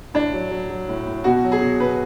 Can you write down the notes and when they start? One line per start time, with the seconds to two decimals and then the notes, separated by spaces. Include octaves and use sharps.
0.14 A2 D4
0.33 F#3
0.51 F#3
0.70 F#3
0.89 A2
1.06 A2
1.24 B2 F#4
1.44 F#3
1.52 G#4
1.62 B2
1.80 B2 B4